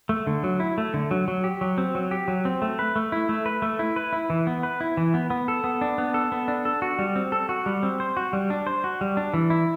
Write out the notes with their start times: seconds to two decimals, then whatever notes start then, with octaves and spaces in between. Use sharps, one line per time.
0.09 A3
0.27 D3
0.44 F#3
0.60 E4
0.78 A3
0.94 D3
1.11 F#3
1.28 F#3
1.44 G4
1.61 F#3
1.78 C4
1.95 F#3
2.11 G4
2.28 F#3
2.45 C4
2.62 A3
2.79 B4
2.96 A3
3.12 E4
3.29 A3
3.46 B4
3.62 A3
3.79 E4
3.96 B4
4.13 E4
4.30 E3
4.47 B3
4.63 B4
4.81 E4
4.97 E3
5.14 B3
5.30 B3
5.48 A4
5.64 B3
5.81 D4
5.98 B3
6.14 A4
6.32 B3
6.48 D4
6.65 A4
6.82 F#4
6.99 G3
7.16 C4
7.32 A4
7.49 F#4
7.66 G3
7.83 C4
8.00 C5
8.17 F#4
8.33 G3
8.50 D4
8.67 C5
8.84 F#4
9.01 G3
9.17 D4
9.34 E3
9.50 E4